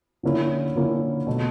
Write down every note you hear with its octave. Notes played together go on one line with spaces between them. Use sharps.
D3 F3 A#3 C#4 E4
D3 F3 A#3 C#4 E4
B2 F#3 A3